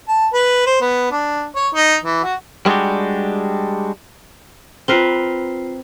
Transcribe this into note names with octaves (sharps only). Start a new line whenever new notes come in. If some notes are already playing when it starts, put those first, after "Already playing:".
A5
B4
C5
B3
D4
C#5
D#4
E3
F#4
G3 G#3 D4 F#4 G4
C4 F4 A#4 B4 C7 G7